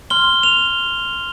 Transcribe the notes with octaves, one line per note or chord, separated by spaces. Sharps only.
C6 F6 G7
F7